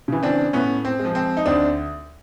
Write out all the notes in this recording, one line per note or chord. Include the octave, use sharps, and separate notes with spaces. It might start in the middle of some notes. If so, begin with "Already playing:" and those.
C#3 E3
C4 D4
A2 B3 C#4
C4
G#3
F3
C4
D#4
D2 C4 D4